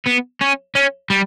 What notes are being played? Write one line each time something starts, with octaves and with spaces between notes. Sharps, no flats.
B3
C#4
C#4
G3